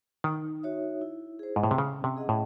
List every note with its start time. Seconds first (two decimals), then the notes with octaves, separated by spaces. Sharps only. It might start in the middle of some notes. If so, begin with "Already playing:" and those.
0.24 D#3 D#4
0.63 F#4 C#5 E5
1.02 E4
1.39 G#4 C5
1.56 G#2
1.63 A2
1.71 C3
1.78 C#3 C#4
2.04 C3
2.17 G#4 D#5 F#5
2.29 A2